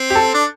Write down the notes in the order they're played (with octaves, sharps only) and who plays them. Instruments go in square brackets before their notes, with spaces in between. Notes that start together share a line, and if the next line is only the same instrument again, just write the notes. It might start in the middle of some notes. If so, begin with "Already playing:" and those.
Already playing: [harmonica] C4
[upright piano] G4
A4
[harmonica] D4